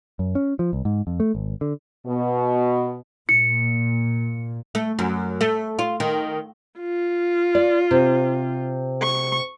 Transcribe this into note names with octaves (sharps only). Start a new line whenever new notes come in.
F#2
C#4
F3
C2
G#2
F2
A3
G#1
D3
B2
A#2 C#7
A3
F#2
A3
F4
D#3
F4
D5
C3
C#6